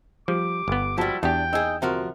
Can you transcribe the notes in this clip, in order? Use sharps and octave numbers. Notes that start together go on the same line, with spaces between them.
F3 G3 D6
G1 B3
F3 G3 E4 F#4 A5
E2 D4 G4 G5
D#4 G#4 E6
D2 C3 F3 F#4 A#4